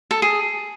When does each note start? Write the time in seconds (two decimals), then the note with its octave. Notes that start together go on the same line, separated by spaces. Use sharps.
0.11 A4
0.22 G#4